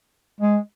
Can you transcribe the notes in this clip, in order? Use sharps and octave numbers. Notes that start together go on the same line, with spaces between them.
G#3